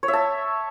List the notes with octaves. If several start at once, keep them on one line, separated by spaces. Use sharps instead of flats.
C#5
E5
A5